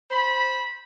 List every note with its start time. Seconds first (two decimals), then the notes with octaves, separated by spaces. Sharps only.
0.11 C5 B5